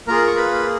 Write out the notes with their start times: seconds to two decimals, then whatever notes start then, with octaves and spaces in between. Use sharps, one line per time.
0.07 A#3 F4 G#4 A#4 A#5
0.27 C#6
0.36 B4 B5